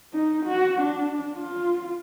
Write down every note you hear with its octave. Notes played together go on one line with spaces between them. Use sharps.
D#4
F#4
D4
F4